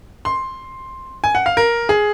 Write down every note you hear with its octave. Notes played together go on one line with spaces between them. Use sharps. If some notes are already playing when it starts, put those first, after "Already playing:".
C6
G#5
F#5
F5
A#4
G#4